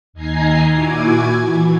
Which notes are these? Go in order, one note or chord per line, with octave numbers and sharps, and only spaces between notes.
D#2 D#4 G#5 A#5 C7
A#2 E4 F#4 G#5 D6 G#6
E3